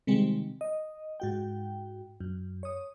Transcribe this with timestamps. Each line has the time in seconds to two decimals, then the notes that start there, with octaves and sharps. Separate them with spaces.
0.07 C3 D#3 G3 G#3 C4
0.61 D#5
1.20 G#2 F#4 G5
2.20 F#2
2.63 C#5 D#6